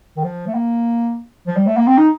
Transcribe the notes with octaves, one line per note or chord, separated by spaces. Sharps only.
D#3
F3
A3
A#3
F3
G3
A3
A#3
C4
D#4